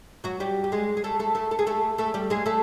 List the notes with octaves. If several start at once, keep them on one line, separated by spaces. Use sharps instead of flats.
F#3 F#4
G3 G4
G4
G#3 G#4
G#4
A3 A4
A3 A4
A3 A4
A4
G#4
A3 A4
A3 A4
G3 G4
G#3 G#4
A3 A4